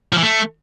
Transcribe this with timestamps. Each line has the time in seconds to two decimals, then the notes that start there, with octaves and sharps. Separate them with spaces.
0.13 F3
0.18 E3
0.23 A3